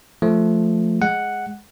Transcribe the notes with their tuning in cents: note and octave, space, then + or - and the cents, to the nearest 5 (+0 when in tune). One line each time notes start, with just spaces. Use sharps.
F3 +0 A3 +0
G#3 +0 F#5 +0